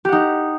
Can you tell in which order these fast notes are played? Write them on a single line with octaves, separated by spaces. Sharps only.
G4 F#5 D#4